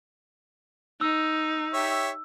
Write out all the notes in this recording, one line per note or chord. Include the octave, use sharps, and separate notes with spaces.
D#4 E6
G4 C#5 E5